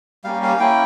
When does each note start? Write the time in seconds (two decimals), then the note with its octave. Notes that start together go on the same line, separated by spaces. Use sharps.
0.24 G3 A#3 C#4 F5
0.43 F5
0.59 A#3 C#4 E4 G5